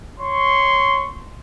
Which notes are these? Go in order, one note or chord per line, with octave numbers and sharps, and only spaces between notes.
C#5 C6 C#6